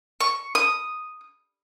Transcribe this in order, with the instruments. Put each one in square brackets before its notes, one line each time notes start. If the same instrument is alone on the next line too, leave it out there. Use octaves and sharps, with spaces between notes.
[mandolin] C#6
D#6